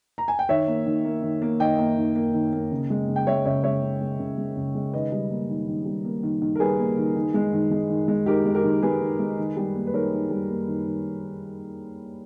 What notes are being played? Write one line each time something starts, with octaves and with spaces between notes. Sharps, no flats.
A#5
G#5
G5
D#3 C#5 E5
A#3
D#3
A#3
D#3
A#3
D#3 D#5 G5
A#3
D#3
A#3
D#3
A#3
C#3
G#3
C#3
G5
G#3 C#5 E5
C#3 C#5 E5
G#3 C#5 E5
C#3
G#3
C#3
G#3
C#3
G#3
D#3 B4 D#5
G3
A#3
D#3
D#3
G3
A#3
D#3
D#3
A#4
G3 G#4 B4
A#3
D#3
D#3
G#3
D#3
G#3
D#3
G#3
D#3 G4 A#4
G#3
G4 A#4
D#3
G#3 G#4 B4
D#3
G#3
D#3
G3
A#3
B4
D#3 A#4 C#5
D#3
G3
A#3
D#3
D#3